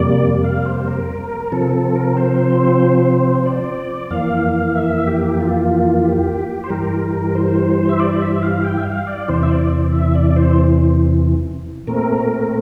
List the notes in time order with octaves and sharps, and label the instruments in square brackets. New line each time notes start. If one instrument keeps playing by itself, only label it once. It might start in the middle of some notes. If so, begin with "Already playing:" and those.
Already playing: [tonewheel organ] F2 C3 G3 A#3 D5
F5
C5
A#4
A#4
C3 F3 C4 A4
A4
A#4
C5
D5
F2 E3 A#3 F5
E5
G4
F4
G4
C5
G2 E3 G3 A#4
C5
E5
D5
E5
E5
F5
G5
E5
F5
D5
E2 C3 E3 C5
E5
D5
E5
D5
D5
C5
A#2 A3 C4 A#4